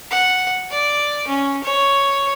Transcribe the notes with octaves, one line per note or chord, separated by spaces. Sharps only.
F#5
D5
C#4
C#5